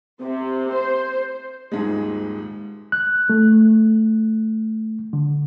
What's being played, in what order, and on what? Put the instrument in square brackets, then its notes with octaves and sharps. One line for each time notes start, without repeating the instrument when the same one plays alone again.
[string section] C3
C5
[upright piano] D#1 G#2 G#3
[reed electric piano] F#6
A3
D3